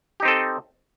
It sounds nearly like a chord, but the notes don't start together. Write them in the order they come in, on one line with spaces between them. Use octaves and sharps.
G4 D#4 C4 A4 D#5